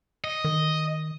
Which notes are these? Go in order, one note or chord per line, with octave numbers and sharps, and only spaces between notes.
D#5
D#3